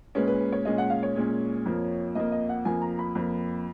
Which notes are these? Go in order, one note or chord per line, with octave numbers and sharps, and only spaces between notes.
A#2 G#3 C#4 B4
B4
B4
C#5
A#2 G#3 C#4 D#5
F#5
F5
C#5
A#2 G#3 C#4
F2 F3 A#3
F2 F3 A#3 D#5
D#5
F#5
F2 F3 A#3 G#5
A#5
B5
F2 F3 A#3